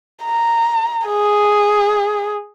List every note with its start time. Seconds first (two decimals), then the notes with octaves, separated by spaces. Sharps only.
0.24 A#5
1.07 G#4